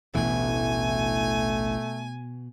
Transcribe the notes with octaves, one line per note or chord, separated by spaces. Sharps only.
A1 D2 B2 E3 A3 G#5